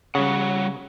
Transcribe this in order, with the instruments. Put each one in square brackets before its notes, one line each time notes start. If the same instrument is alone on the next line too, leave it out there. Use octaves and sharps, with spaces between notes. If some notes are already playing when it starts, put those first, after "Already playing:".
[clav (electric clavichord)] C#3 [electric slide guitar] G3 C#5 F#5